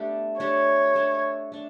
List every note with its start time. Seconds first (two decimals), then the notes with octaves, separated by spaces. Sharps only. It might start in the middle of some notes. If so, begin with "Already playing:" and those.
Already playing: A3 B3 D4 G4 A4
0.40 A3 D4 G4 C#5
0.95 A3 D4 A4
1.52 A3 D4